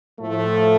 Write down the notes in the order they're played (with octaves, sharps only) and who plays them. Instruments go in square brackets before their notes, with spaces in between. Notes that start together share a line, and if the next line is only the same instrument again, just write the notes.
[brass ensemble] A2 F3 A3